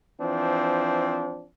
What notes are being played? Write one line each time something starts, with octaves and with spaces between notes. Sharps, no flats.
E3 F3 C4 D4